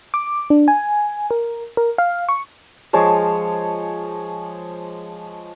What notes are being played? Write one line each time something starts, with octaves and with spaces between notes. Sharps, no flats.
D6
D4
G#5
A#4
A#4
F5
C#6
F3 G#3 C#5 A5